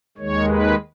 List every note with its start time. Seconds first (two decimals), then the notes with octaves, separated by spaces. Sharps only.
0.18 D#2 D#3 G#3 C#5
0.47 B4